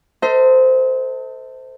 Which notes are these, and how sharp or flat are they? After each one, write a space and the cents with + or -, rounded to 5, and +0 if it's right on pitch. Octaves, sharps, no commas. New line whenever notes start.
A4 +30 C5 -15 D#5 +40